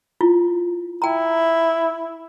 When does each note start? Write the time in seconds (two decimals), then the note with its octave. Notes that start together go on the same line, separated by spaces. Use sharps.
0.21 E4 F4
1.02 E4 G5 A#5